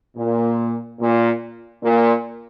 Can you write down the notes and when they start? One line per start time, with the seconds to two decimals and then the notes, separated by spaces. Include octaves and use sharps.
0.17 A#2
1.00 A#2
1.83 A#2